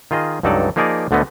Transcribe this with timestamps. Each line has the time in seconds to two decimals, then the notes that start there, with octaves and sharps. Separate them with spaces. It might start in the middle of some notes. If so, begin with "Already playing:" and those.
0.11 D#3 F4 G#4 D#5
0.43 C#2 G2 F#3 D#4 A4 D5
0.76 F3 A#3 D#4 G#4 A#4 D5
1.11 D2 D3 A3 B3 D#5